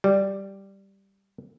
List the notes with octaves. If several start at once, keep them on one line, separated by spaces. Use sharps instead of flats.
G3